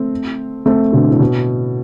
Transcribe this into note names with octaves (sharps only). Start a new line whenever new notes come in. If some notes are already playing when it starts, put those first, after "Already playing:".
Already playing: A3 C4
A3 C4
B2 D3
A2
B2